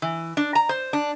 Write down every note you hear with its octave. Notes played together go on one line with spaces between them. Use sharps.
E3
D4
A#5
C5
D4